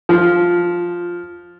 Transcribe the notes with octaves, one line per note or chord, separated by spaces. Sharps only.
F3